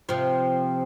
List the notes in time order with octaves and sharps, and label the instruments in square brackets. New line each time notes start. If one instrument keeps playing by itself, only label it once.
[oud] C3 F3